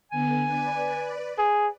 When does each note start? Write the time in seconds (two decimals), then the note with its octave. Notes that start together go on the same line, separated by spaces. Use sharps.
0.12 D3 B3 G#5
0.44 B4 D5
1.38 G#4